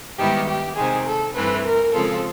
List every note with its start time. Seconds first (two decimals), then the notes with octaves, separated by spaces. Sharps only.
0.18 G#2 D#3 G3 B3 E4 G4
0.48 G4
0.76 C3 D#3 G#3 G#4
1.06 A4
1.35 G2 E3 A3 C4 B4
1.65 A#4
1.93 C#3 F3 G#3 C4 F4 A4